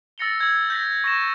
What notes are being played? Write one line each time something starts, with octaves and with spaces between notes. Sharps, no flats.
E6 A6 A#6 C#7 F7 G7
E6 G#6
G6 A#6 B6
C#6 A#6 E7